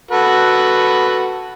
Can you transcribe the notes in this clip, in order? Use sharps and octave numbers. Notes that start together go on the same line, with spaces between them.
F#4 A4 B4